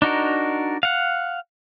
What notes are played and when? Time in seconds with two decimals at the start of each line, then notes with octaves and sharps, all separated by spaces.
0.02 D4 D#4 F#4 A#4
0.83 F5 F#5